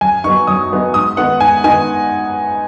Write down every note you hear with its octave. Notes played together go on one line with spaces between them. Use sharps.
F#2 G#5
F#3 B3 D#4 C#6
F#2 D#6
F#3 B3 D#4
G#2 D#6
D#3 B3 D#4 F#5
G#2 G#5
D#3 B3 D#4 G#5